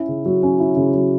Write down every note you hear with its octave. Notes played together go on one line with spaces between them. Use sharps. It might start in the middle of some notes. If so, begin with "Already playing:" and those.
Already playing: C#4 E4
C#3
F#3
C#4
E4
C#3
F#3